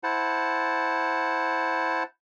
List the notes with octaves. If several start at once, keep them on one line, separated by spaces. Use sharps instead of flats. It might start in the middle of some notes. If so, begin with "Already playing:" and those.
E4 C5 F#5 A5